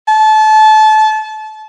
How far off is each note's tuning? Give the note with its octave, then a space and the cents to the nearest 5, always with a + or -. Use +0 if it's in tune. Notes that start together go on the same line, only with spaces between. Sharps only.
A5 -25